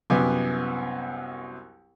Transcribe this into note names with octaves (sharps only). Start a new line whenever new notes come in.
C2 F#2 B3 G#5 D6